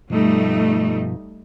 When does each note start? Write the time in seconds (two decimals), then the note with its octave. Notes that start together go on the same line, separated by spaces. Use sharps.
0.10 G2 B2 F3 G3 A3 D#4